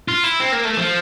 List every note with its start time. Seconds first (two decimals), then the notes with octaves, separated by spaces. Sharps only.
0.08 F4
0.24 E4
0.40 C4
0.52 A#3
0.65 A3
0.77 F3